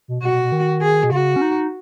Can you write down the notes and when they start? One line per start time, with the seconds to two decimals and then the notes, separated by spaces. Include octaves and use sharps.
0.08 B2
0.22 B2 F#4
0.33 B2
0.43 B2
0.52 D#3
0.82 G#4
1.04 B2
1.11 C#3 F#4
1.36 C#4
1.42 D#4